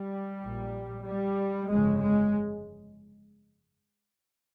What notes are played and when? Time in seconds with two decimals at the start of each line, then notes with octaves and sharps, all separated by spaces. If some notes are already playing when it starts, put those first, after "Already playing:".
Already playing: G3
0.42 A#1 A#2
1.05 G3
1.69 G1 F2 C#3 G#3
2.00 G#3